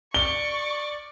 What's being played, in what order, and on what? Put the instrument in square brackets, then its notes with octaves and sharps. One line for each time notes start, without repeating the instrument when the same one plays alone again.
[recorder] D5 [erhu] C#6 [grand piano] G7